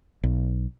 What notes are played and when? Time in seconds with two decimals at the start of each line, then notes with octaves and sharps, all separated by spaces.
0.23 B1